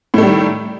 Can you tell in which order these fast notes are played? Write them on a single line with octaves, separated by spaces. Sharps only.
A2 A3 G3 D#3